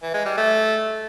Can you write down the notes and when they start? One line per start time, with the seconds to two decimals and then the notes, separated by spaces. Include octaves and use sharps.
0.02 E3
0.14 G#3
0.26 G3
0.37 A3